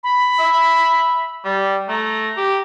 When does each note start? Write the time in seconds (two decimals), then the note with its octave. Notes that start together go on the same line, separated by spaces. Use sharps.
0.03 B5
0.39 E5
1.45 G3
1.88 A3 A#5
2.37 G4